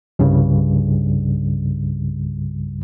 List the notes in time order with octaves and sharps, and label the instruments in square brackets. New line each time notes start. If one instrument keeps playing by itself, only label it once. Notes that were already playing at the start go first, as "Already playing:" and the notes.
[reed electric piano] C2 G2 C#3 G3